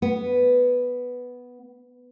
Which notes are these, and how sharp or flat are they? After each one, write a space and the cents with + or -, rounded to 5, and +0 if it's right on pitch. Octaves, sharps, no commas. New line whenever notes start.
B3 +0